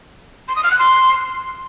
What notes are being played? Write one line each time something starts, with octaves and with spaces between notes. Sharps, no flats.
C6
D#6
F6
F#6
C6